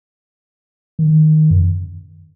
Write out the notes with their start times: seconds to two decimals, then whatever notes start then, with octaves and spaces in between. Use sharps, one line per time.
0.99 D#3
1.51 F#2